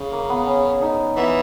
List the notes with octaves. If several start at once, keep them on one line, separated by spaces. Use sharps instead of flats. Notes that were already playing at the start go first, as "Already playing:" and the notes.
Already playing: C#3
A#3
B3
C#4
D#4
E3 B3